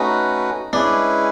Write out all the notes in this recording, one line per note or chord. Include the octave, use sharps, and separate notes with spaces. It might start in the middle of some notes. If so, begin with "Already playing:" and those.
Already playing: A3 C#4 D#4 F#4 B4
G#3 C#4 D4 E4 G#4 B4